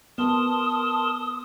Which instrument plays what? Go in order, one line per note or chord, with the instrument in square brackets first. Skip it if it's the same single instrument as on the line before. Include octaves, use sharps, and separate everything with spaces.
[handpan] B3 [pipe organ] A#4 A5 C6 [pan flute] D#6